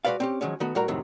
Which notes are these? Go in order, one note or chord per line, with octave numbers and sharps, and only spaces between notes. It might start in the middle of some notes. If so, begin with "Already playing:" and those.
G#3 F#4 A4 B4 D5 F5
C4 C#4 G4
D#3 F3 F#3 G#3 C#4
D#3 A3 B3 F#4
A2 G3 F#4 A#4 A#5
F2 A2 C3 D#3 F#3